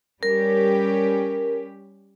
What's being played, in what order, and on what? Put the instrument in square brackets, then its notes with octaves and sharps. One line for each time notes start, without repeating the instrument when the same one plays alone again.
[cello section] G3 C#4 G4 [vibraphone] A#4